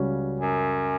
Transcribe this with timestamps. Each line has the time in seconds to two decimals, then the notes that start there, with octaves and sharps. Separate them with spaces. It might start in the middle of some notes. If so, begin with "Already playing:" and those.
Already playing: C#2 C#3 G3 C#4 F#4
0.40 F#2